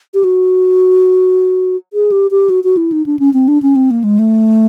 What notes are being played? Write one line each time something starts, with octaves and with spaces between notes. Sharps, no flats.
G4
F#4
G#4
G4
G4
F#4
F#4
E4
D#4
D4
C#4
C4
D4
C#4
C4
A#3
G#3
A3